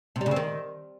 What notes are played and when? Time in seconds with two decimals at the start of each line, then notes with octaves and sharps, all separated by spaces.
0.16 C3
0.21 G3
0.26 C#3
0.31 C4
0.36 D#3